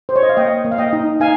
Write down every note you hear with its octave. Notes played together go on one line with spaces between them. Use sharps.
C5
C#5
D#5
F5
A#3 D#5 G5
A#3
F5
D#5 G5
D#4
D#4 F5 G#5